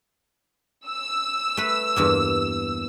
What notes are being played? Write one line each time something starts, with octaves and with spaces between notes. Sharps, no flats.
E6
A3 B4
E2 G2 A#3